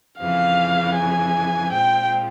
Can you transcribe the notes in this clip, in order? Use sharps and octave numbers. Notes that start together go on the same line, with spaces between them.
F2 C#3 E3 F5
G#5
A#2 G#3 C4 F4 G5